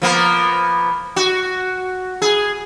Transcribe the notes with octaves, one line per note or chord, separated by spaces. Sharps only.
F3 A#3 B3
F#4
G#4